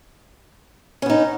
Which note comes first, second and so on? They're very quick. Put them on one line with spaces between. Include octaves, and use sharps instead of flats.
C#4 B3 D#4